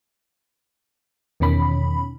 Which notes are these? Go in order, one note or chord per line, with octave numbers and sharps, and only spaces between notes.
E2 B2 D#3 C#4 B5